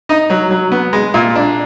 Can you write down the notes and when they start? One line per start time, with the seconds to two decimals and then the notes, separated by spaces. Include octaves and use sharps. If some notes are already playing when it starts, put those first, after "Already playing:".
0.09 D#4 D#5
0.30 F#3
0.51 F#3
0.72 B3
0.93 G#3
1.14 A#2
1.35 D4